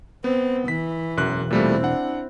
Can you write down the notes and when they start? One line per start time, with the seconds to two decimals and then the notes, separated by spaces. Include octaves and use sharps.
0.24 B3 C4
0.68 E3 B6
1.17 E1 F#2 F#6
1.50 A#2 G3 A3 C4 E4
1.83 D4 F#5